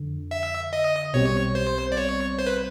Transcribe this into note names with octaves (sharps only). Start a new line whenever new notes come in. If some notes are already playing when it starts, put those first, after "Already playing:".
Already playing: F2 D3
E5
D#5
B1 B2 G3 C4 C#5
C5
D5
C#5
C5
B4